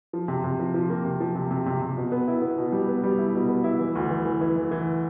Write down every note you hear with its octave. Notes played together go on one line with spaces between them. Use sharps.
F3
C3
C3
F3
F3
A#3
C3
F3
C3
C3
C3
C3
B2
B3
E4
B3
B2
G3
B3
G3
E4
B2
B3
E4
E3
D2
E3
E3
E3
E3
E3